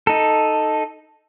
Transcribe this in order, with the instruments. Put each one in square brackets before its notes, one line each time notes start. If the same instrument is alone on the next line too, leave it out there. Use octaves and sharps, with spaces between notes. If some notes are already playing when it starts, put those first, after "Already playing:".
[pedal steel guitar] D#4 A4